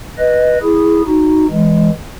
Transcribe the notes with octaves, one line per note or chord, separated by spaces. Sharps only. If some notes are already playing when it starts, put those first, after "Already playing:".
B4 D#5
E4 G#4
D#4 F#4
E3 G#3